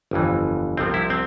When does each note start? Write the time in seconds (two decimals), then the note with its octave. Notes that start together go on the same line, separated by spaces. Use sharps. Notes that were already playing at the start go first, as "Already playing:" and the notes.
0.11 G1 F2 E3
0.77 C2 C3 F3 C4
0.94 E4
1.10 C4